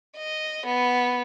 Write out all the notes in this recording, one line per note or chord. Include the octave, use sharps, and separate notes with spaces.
D#5
B3